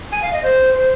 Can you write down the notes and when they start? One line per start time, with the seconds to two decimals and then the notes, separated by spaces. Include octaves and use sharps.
0.12 G#5
0.22 F5
0.33 D#5
0.43 C5
0.74 C5